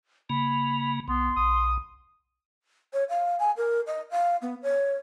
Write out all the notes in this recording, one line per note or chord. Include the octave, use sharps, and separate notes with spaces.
C#3 A#3 B5
C2 B3 C6
B1 D#6
C#5
F5
G#5
A#4
D#5
F5
B3
C#5